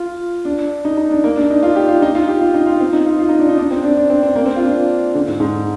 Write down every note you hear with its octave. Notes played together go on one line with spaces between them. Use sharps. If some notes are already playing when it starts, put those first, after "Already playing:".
Already playing: F4
D4
D#4
D#4
D4
A#3
D4
D#4
F4
G4
F4
D#4
F4
G4
F4
D#4
F4
C4
D#4
F4
F4
D#4
D4
D#4
D4
C4
D4
D4
C4
C4
A#3
C4
F4
D4
D3
G#2
G#2